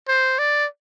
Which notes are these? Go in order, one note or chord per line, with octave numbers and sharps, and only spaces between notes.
C5
D5